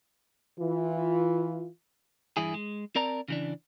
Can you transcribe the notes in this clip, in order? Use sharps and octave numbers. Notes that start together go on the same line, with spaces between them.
E3 F4
G2 E3 E4 G#4
G#3
C4 A#4 D5 A5 A#5
C#3 E3 D4